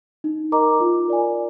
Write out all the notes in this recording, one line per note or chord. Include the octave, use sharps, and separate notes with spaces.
D#4
A#4 D#5 A#5 D6
F4
A#4 D5 G#5